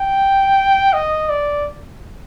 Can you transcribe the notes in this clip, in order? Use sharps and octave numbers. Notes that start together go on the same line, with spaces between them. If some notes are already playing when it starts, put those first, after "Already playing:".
Already playing: G5
D#5
D5